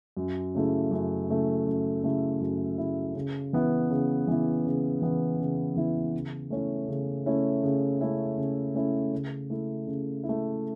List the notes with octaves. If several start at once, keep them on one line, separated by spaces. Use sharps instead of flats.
F#2
C#3 A3 E4
F#2
C#3 A3 E4
F#2
C#3 A3 E4
F#2
C#3 A3 E4
C#3
E3 B3 E4
C#3
E3 B3 E4
C#3
E3 B3 E4
C#3
E3 B3 E4
C#3
A3 C#4 E4
C#3
A3 C#4 E4
C#3
A3 C#4 E4
C#3
A3 C#4 E4
C#3
A3 E4
C#3
E4
A3